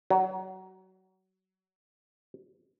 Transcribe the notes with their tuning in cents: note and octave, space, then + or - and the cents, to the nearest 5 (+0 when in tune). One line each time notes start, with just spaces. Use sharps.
F#3 +25